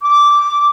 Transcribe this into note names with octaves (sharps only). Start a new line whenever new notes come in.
D6